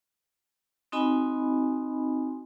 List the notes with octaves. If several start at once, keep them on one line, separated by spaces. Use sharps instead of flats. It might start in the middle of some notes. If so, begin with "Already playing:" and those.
C4 D#4 F#4 D#5 G#5 B5